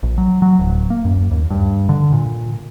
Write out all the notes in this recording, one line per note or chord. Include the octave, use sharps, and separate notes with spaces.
A#1
F#3
F#3
D1
A#3
F#2
D#2
G2
D3
A#2